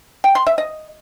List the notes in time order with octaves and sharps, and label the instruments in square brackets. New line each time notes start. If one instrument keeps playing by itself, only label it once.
[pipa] G5
C6
E5
D#5